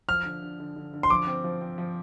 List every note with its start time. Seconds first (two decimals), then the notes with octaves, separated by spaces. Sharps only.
0.08 F3 F6
0.25 D3
0.42 D3
0.60 D3
0.76 D3
0.93 D3
1.03 C6
1.10 F3 D6
1.27 C4
1.44 F3
1.61 C4
1.78 F3